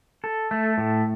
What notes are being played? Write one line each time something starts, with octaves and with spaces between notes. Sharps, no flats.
A4
A3
A2